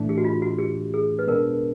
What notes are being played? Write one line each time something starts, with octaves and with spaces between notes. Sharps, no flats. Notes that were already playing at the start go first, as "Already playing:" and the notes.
Already playing: A2 E3 A3 D4
G4
F#4
F4
F#4
G4
G#4
B4
B2 G#3 B3 D4 A#4